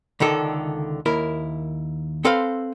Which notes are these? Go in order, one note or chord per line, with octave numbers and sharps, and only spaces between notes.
C#2 D3 D#3 A4
D#2 E4 A#4
C4 A4 B4 C5 F5